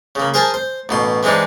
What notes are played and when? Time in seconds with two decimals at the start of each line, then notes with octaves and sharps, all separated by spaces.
0.15 C#3 A#3
0.34 G#4 A#4 C5 G#5 A5
0.54 C5
0.89 A1 B2 C6
1.23 E3 G#3 C4 D4 D#4